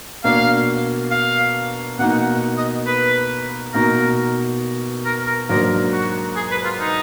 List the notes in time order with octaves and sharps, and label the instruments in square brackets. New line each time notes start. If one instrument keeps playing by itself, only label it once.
[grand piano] B2 A#3 D4 [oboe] F5
[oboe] F5
[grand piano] B2 A#3 D#4 [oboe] F#5
[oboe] F#5
D#5
B4
[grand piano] B2 A#3 D#4 [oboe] A#4
[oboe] A#4
A#4
[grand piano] G#2 F#3 A#3 D4 [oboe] A#4
[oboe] F#4
G#4
B4
F4
D#4